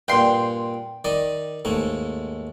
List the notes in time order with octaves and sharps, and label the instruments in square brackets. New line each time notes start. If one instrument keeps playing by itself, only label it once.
[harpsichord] G2 A#2 [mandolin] G5 C6
[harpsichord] D#3 D5 D#5
D#2 G#2 A3